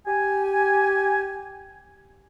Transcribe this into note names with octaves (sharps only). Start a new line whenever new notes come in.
G4 G#5